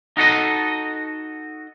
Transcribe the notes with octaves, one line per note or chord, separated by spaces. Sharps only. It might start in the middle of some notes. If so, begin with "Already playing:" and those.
D#4 F#4 A4 D#5